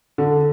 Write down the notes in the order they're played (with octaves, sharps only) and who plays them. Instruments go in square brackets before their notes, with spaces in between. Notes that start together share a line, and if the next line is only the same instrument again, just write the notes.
[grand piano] D3